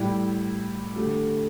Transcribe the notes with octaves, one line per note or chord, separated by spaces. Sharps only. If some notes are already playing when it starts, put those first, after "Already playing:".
Already playing: A2 G3 E4
D3 A3 G4